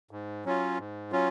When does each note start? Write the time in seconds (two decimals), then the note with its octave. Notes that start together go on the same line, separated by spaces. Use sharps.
0.11 G#2
0.45 F#3 C#4 F4
0.78 G#2
1.12 F#3 C#4 F4